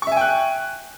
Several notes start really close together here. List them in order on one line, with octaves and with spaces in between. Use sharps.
C#6 E5 G#5 G5 F#6